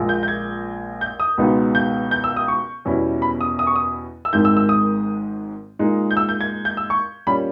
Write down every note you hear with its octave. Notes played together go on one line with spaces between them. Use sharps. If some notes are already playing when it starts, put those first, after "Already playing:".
Already playing: A#1 A#2 G#3
G6
G6
G#6
G6
D#6
C#2 B2 G#3 B3 D#4
G6
G6
E6
D#6
C#6
E2 B2 G3 C#4 E4
B5
D#6
D#6
C#6
D#6
E6
G#1 G#2 D#3 G#3 G6
E6
E6
D#6
A#2 G#3 D#4
G6
E6
G6
G#6
G6
E6
C#6
A#2 G3 C#4 B5